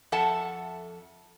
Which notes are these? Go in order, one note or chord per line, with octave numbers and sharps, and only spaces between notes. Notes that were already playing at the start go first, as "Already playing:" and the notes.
F2 A4 E5 F#5 A5